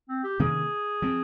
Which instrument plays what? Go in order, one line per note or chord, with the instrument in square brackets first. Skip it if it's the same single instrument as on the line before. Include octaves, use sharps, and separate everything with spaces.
[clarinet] C4
G4
[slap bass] C3 D#3 A#3 C#4 [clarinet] G#4
[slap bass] F3 C4